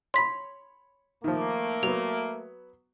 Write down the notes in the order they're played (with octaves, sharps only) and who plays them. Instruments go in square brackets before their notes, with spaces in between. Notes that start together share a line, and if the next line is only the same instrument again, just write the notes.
[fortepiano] C#5 B5 [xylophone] C6 B6
[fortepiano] D#3 F3 [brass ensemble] A3 A#3
[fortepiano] F#3 B3 [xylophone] F7